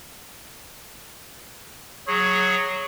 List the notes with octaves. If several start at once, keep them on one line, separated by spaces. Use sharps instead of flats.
F#3 G#4 C#5